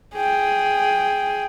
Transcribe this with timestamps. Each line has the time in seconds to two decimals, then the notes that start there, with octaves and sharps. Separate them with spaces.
0.15 G#4 G5